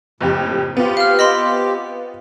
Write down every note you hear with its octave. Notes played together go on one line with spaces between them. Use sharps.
F#1 F2 A2 G4
B3 C4 F4 G4
F5 F6
D#5 B5 C6